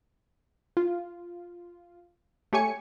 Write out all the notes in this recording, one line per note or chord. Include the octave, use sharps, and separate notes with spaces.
F4
A3 G4 C#5 G#5 C#7